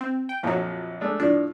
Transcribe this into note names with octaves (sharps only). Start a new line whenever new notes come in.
C4
G5
A#1 F2 F3 F#3
G#3 A3 D4
A2 F3 D4